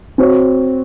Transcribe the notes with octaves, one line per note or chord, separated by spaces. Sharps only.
C4 F#4 C#5